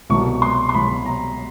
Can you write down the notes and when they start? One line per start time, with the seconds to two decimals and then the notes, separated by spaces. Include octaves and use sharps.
0.10 C2 B2 F#3 C#6
0.42 C6
0.69 C6
0.74 C2 B2 F#3 B5
1.06 A#5